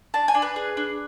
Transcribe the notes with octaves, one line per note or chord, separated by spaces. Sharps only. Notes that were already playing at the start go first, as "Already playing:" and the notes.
D4 A5
G#5
D4
B4
G#4
D4